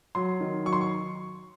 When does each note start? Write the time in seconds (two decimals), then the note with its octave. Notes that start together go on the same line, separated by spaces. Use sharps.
0.15 F#3 C6
0.41 D#3
0.65 F#3 C#6
0.73 C6
0.81 C#6